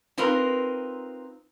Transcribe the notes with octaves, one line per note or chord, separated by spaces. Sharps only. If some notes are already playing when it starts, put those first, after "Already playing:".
C4 D#4 F4 A#4 B4